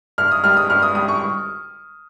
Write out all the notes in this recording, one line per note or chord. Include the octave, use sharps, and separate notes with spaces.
G2 F6
D#6
G3 F6
D#6
G2 F6
D#6
G3 D#6
C#6